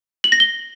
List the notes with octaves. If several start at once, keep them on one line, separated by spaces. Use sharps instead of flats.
F#7
A#6
G7